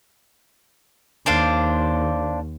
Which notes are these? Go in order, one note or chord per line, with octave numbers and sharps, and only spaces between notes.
D#2 D4 C5 F5